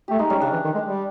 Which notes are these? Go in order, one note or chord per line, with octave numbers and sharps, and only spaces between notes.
A3 G4
G#3 D#4
G3 C#4
C#3 D4
E3
D#3
G#3
G3